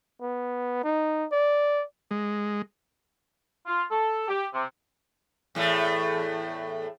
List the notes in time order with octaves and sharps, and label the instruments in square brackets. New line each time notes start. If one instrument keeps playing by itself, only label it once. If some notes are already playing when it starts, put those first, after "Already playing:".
[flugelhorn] B3
D#4
D5
[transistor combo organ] G#3
[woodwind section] F4
A4
G4
C3
[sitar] E2 A2 A3